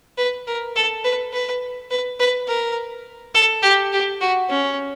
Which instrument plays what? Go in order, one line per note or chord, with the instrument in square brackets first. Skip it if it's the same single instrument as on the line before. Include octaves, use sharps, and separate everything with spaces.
[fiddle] B4
A#4
A4
B4
B4
B4
B4
A#4
A4
G4
G4
F#4
C#4